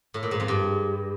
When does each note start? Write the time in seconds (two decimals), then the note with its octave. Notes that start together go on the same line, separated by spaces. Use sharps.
0.14 A2
0.23 A#2
0.31 G#2
0.40 F2
0.48 G2